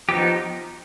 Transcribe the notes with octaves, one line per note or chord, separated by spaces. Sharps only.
F3 B3 D#4 G4